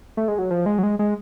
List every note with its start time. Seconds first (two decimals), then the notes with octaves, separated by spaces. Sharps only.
0.17 A3
0.28 G#3
0.38 F#3
0.50 F3
0.66 G#3
0.78 F#3
0.83 G#3
0.99 G#3